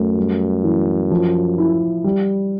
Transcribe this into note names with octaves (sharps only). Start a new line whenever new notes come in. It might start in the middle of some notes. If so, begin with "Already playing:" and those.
Already playing: F#2 A3
G3
E3
F3
E4
G3